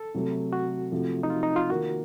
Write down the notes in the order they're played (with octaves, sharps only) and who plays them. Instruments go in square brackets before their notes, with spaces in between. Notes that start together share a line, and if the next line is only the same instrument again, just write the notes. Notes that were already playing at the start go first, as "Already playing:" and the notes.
Already playing: [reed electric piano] A4
[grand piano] C3 F#3 A3
[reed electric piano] F#4
[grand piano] C3 F3 A3
[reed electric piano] D#4
F4
D#4
F4
[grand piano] D#3 A#3 F4 [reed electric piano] F#4